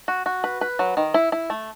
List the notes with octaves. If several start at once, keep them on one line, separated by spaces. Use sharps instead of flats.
F#4
F#4
B4
B4
F#3
D#3
E4
E4
A3